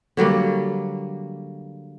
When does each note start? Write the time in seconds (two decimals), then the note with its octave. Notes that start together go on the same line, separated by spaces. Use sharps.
0.17 D3 F#3 G3 A#3